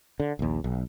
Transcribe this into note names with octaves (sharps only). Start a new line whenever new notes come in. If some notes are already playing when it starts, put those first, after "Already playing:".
D3
A#1 D#2
B1